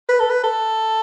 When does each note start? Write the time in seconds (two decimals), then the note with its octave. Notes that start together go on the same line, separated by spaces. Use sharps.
0.09 B4
0.20 A4
0.30 B4
0.43 A4